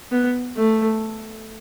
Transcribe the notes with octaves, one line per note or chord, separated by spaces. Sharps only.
B3
A3